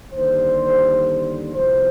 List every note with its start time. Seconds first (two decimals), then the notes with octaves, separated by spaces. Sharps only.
0.12 D#2 D3 G3 C5
1.54 C2 C3 F3 B3 C5